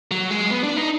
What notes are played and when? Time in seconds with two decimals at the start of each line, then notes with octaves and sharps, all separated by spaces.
0.11 F#3
0.30 G#3
0.51 B3
0.64 D4
0.76 D#4